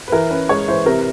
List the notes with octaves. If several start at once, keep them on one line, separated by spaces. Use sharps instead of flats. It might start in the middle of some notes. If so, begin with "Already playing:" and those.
B4
E3 A#4
C#4 B4
G#3 C#5
E3 C5
C3 A#4